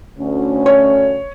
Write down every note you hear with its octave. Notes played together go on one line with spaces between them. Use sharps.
D2 C#4
C#5